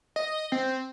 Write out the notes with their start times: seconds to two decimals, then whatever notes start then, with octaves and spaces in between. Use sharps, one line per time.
0.16 D#5
0.52 C4